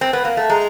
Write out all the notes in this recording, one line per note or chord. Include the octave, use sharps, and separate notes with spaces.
C4
B3
A#3
A3
G#3 A#5